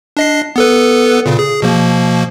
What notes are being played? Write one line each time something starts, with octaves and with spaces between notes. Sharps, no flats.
D4 D#5 C7
B3 A4 B4
A#2 C#3
G#4
B2 F3 A#3